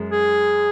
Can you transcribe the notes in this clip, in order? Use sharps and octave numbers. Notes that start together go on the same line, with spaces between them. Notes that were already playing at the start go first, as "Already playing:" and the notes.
Already playing: F#2 G#3
G#4